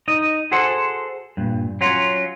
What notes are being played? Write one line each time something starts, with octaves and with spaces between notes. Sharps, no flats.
D#4 D#5
F#4 G#4 A4 C5 F#5
G2 A#2
F#3 C#4 F4